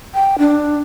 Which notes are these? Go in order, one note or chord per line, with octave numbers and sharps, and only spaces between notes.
G5
D4